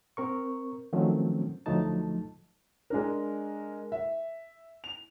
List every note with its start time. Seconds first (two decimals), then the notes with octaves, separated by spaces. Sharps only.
0.17 C4 A#4 C#6
0.93 D#3 F3 F#3 A3 C4 C#4
1.66 D2 F3 F#3 A3 D#4 A5
2.90 G#3 D4 A#4
3.92 E5
4.84 F7